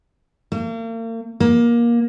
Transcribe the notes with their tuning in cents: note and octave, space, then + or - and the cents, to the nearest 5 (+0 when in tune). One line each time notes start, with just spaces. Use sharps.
A#3 -40
A#3 +20